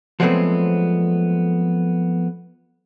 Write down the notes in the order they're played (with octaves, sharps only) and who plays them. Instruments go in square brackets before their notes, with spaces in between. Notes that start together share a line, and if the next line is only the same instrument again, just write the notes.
[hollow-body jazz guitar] F3 F#3 G#3 A3 B3 C4